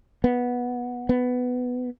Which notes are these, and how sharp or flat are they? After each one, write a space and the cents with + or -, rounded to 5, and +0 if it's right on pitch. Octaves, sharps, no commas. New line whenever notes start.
B3 -10
B3 +10